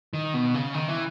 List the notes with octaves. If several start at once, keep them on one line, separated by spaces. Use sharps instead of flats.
D#3
B2
C#3
D#3
E3